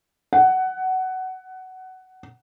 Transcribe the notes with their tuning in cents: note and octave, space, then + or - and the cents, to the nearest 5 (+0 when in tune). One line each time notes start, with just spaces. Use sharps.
F#5 +15